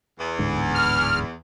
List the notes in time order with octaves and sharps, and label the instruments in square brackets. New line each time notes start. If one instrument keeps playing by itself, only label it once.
[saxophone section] E2
[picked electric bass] D1 G#2 D3
[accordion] F6